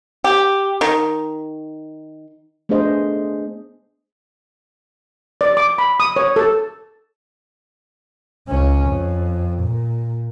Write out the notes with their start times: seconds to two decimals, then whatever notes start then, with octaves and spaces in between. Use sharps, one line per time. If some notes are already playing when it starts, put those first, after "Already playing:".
0.24 G4
0.81 D#3
2.69 A3 B3 D4 G#4 C5 D#5
5.41 D5
5.57 D6
5.78 B5
6.00 D#6
6.16 C#5
6.36 A4
8.48 C#2 C#4
8.85 F2
9.62 A#2